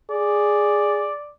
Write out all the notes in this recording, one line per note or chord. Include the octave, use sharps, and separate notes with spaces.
G#4 D5